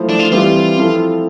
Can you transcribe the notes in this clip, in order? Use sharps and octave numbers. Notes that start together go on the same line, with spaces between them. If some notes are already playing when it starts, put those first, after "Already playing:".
Already playing: F3 A3 E4 A4 C5
D4
F4
E3 G3 C4 F4 G4 B4
F3 C4 E4 A4